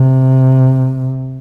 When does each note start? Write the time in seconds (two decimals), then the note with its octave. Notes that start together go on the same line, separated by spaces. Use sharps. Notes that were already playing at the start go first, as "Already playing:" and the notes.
Already playing: C3